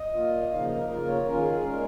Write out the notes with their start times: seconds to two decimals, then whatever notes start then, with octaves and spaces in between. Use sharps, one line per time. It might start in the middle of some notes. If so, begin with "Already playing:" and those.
Already playing: D#5
0.14 A#2 A#3 F4
0.51 C#3 F3 A#3 D#4 F5
0.64 D#5
0.75 A#4
0.89 C#3 A#3 F4 A#4
1.07 C#5
1.25 D#3 C#4 F4 A#4
1.38 G#4
1.51 G#4
1.62 A#2 G#3 C#4 A#4